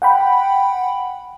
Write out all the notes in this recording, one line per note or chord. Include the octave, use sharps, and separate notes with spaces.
F#5 G5 B5